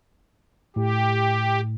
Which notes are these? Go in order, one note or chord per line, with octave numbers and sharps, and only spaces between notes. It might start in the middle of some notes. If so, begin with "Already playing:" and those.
A2 G4